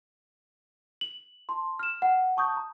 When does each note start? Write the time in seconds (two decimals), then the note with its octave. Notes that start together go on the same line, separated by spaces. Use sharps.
1.01 F#7
1.49 A5 C6
1.79 F6 E7
2.02 F#5
2.37 A5 C#6 D#6 G6
2.56 A#5